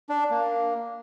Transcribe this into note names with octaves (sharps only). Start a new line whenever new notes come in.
D4
A#3